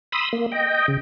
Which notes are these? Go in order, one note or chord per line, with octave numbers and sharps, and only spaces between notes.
B5 C6 D#6 E6
A#3
D#5 G5
C#3